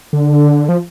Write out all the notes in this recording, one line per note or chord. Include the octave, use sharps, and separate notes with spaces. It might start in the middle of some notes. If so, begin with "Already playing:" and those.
D3
F3